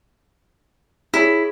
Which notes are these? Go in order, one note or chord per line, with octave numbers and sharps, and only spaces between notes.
E4 G#4 C#5